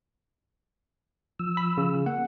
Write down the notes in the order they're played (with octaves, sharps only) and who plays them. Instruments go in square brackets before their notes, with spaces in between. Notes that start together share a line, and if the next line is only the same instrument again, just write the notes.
[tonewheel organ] F3 E6
[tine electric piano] B5
C#3
[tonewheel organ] A#3 [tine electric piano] F#5